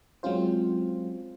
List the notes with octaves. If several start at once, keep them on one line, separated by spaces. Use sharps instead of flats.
F#3 G#3 C4 C#4 F4 C5